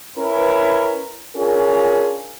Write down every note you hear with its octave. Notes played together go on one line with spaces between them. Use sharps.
C#4 E4 A#4 B4
C#4 D4 F4 G#4 A#4